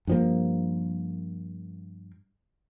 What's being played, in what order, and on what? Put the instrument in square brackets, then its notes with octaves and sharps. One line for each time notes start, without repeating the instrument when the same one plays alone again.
[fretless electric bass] G2 F3 A#3